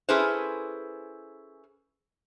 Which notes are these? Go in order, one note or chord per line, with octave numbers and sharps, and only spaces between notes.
C#4 E4 G#4 A4 B4 C5